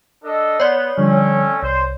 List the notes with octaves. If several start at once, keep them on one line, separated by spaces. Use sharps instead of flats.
D4 A4 D#5
B3 C#5 D5
D3 F3 G3 A3 C4 C#4
C2 C5